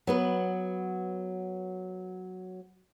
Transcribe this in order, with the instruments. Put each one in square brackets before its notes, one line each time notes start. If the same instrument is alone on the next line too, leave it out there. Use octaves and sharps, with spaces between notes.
[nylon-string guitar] F#3 B3 B4